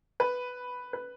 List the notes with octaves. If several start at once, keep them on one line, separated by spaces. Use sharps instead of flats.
B4
B4